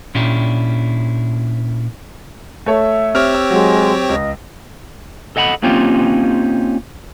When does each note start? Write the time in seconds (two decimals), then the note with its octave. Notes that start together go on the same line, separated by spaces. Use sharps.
0.14 A#2 C#4 D4 E4 G4
2.66 A3 A4 C#5 E5
3.15 C4 G4 C#5 F6
3.34 E6
3.51 F#3 G#3
4.09 C#2 D#5
5.36 A4 D#5 F#5 A#5 B5
5.63 A#3 C4 C#4 D#4 F4 G4